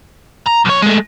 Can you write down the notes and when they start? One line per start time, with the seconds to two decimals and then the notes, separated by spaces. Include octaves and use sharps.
0.47 A#5
0.66 B1 C#5
0.82 G#3 A3